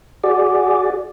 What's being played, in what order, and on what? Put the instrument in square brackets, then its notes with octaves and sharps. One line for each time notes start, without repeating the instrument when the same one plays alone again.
[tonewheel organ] F#4 G#4 D5